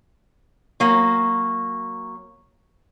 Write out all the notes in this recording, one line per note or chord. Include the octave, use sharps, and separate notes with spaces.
F#3 A#3